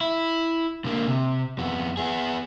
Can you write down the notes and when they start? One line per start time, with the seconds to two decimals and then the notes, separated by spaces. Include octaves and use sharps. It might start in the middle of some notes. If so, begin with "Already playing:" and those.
0.01 E4
0.85 D3 A#3
1.06 C3
1.58 F2 B3
1.97 B3 G#4